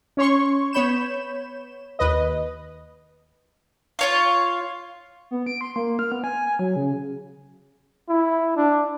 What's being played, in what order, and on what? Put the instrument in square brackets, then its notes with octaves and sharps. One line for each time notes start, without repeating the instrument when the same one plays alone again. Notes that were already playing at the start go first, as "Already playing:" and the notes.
[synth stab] C#4 C#5 C6 C#6
B3 C#5 B5 G6 E7
D#2 B4 D#5
[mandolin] F4 C#5 F5
[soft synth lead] B3
D7
C6
A#3
F6
B3
G#5
G#5
F#3
C#3
[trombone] E4
D4